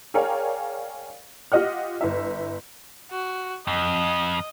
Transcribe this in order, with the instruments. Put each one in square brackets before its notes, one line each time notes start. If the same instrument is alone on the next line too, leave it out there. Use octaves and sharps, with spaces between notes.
[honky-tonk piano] G#4 A#4 C#5 D5 F5 G5
F4 G4 D#5 F#5 F6
G1 E4 E5
[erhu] F#4
[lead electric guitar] F2 [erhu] D#5